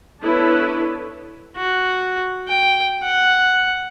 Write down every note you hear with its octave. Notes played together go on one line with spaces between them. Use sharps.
B3 D4 E4 A4 B4 C#5
F#4
G5
F#5